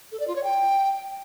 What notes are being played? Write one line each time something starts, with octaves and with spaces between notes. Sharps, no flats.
A4
D5
F4
C#5
G5